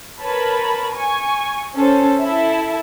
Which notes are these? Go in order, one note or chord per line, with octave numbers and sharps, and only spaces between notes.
A#4 B4 C#5 A5 B5
G#5 C#6
C#4 A4 C5
E4 A4 E5